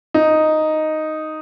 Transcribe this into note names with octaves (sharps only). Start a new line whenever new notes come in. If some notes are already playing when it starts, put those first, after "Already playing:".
D#4